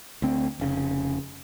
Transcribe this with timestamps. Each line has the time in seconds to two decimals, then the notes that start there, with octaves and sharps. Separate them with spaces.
0.22 D2 C4
0.59 F1 C#3